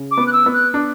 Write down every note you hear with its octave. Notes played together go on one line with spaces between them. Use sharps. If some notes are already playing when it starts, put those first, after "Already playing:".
Already playing: C#3
D6
B3
F#6
E6
B3
F#6
D4